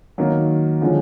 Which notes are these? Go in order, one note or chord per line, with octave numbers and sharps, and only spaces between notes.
D#3 F#3 A#3
D3 F3 G#3 C#4